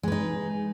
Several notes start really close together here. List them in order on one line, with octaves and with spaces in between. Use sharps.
G#3 B4 D#4